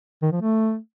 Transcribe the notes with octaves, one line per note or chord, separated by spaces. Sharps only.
D#3
F3
A3